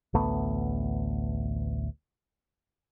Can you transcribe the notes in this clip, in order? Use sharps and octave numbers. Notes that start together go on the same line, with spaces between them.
A1 D2 A3 B3